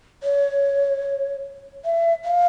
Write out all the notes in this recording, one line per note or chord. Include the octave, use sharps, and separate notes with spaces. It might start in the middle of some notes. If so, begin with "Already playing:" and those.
C#5
E5
F5